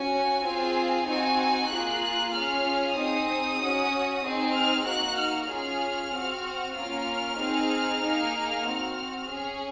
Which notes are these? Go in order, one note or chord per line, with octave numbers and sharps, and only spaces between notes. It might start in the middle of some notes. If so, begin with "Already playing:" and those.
Already playing: C#4 F#4 G#5
C4 F4 G#4
C4 D#4 F#4 G#5
A#3 F4 G#4 F#6
F#6
C#4 F4 G#4 F6
C4 D#4 G#4 D#6
C#4 F#4
C4 D#4 G#4
F6
A#3 D#4 F#4 F#6
F6
C#4 F4 G#4 F6
C4 F#4
A#3 C#4 F4 F6
C4 D#4 G#4
A#3 D#4 G#4
C4 F#4
C#4 G#4